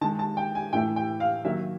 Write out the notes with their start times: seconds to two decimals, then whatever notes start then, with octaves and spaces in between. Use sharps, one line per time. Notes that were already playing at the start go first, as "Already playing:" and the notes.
0.01 D#3 A5
0.04 G#3
0.19 A5
0.37 G5
0.55 G#5
0.73 A2 E3 A3 G5
0.96 G5
1.20 F5
1.44 D#3 F#3 A#3 E5